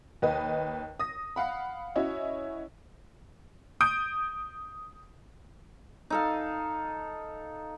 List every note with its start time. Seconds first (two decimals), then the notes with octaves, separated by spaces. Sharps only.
0.22 D#2 B4 D#5
0.99 D#6 A#6
1.36 F5 F#5 B5
1.96 C#4 E4 F#4 C#5 D#5
3.81 D#6 G6 D7
6.10 D#4 A4 F5